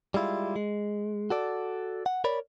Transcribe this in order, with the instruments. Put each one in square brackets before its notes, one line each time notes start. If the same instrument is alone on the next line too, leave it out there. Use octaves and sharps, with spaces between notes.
[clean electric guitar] G3 G#3 E4 F4
G#3
F#4 A4 D5
F#5
A#4 C#5 D5 B5